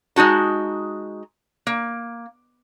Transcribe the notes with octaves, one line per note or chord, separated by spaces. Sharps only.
G#3 D#4 F#4 A5
A#3